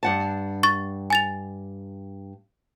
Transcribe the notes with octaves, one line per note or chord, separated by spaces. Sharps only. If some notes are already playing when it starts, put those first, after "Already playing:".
G2 F#5 A5
C#6 A6
G#5 A6 F7